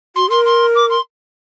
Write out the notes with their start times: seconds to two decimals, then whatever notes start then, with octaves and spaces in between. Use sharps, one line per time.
0.16 F#4 C6
0.30 A#4 C6
0.45 C6
0.75 D6
0.90 C6